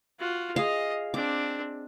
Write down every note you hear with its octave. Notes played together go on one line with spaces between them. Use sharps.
F4 F#4
G#4 D#5 F5
C4 D4 D6